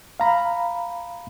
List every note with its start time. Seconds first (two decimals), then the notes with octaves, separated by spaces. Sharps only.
0.20 F5 A#5 B5